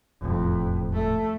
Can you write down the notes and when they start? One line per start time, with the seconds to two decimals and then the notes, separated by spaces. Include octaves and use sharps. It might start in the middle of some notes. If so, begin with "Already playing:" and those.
0.22 E1 F2 A2
0.93 A3